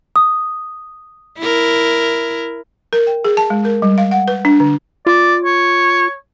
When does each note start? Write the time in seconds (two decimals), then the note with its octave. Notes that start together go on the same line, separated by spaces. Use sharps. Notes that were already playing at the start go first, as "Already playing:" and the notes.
0.16 D#6
1.39 E4 A#4
2.93 A#4
3.07 G5
3.24 G#4
3.37 A5
3.50 G#3
3.65 A#4
3.82 G3
3.98 F5
4.11 F#5
4.28 B4
4.45 D4
4.60 D3
5.07 F4 D5
5.44 C#5